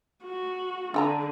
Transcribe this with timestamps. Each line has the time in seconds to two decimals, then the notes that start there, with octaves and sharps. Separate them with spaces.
0.24 F#4
0.94 D3 D4 G5 A#5